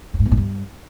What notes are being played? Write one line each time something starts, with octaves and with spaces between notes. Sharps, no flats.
F#2
G#2
E2
A2
G2